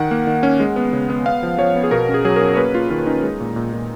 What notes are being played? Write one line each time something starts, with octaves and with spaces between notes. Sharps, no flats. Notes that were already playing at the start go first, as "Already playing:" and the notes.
Already playing: D#3 F#5
A#3
D#3
C#4
G#3
B3
C#3
B3
B3 F5
F3
F3 C#5
B3
G#4
B2 A#4
C#4
G#4
F#3 G#4
C#4 A#4
C#5
A#3 B4
A#3 F4
D#3 F4
C#4 D#4
G#3
A#2
A#2
A#2